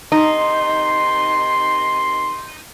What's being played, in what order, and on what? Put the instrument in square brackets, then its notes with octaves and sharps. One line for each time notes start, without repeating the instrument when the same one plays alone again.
[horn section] C3 D#3 C6 [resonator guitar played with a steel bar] D#4